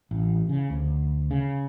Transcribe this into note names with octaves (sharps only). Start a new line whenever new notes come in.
A1
C#3
D2
C#3